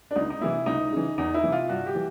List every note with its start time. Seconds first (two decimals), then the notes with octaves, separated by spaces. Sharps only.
0.11 D4
0.16 C#2 D#4
0.30 D#4
0.41 C3 E3 E4
0.66 C#2 D#4
0.92 C#3 E3
1.18 E2 D#4
1.34 E4
1.43 C3 E3
1.52 F4
1.69 G2 F#4
1.87 G4
1.95 E3